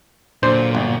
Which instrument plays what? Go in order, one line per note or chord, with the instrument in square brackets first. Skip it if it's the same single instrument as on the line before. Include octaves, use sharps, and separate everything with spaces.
[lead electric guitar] A#2 [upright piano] D3 F#3 D4 [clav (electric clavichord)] C5
[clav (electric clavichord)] G1